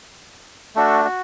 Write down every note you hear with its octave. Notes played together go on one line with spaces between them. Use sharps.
A3 D4 F#4 A4
F#4